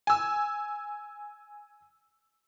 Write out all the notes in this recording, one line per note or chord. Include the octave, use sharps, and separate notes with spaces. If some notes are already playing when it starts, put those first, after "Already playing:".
G#5 E6